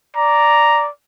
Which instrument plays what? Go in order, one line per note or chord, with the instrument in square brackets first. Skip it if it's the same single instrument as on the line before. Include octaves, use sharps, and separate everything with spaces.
[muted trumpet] D5 [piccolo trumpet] A#5